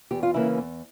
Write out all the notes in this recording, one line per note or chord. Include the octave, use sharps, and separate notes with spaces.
E2 G4
F4
C#3 E3 A#3 C#4 E4
E2